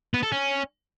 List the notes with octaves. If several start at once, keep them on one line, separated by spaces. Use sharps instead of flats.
B3
A4
C#4